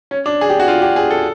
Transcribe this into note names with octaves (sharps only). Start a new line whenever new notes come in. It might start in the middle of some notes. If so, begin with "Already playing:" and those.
C#4
D4
G#4
G4
F#4
F4
G4
G#4
A4